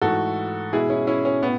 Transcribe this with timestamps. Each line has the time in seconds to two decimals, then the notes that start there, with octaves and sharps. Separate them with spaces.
0.02 G#2 E3 A3 F#4 A4
0.72 B2 G#3 E4 G#4
0.90 C#4 E4
1.07 C#4 E4
1.25 C#4
1.42 A2 B3